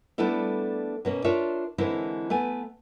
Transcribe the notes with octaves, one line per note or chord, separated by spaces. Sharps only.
G3 A3 B3 D4 E4 A4
B2 A#3 C#4
D4 F4 A#4 C#5 D5 E5
D3 E3 G#3 C4 E4 A#4
A3 B3 G#5